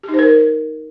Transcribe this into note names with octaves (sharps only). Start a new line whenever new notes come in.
G4
D#4
C5
A#4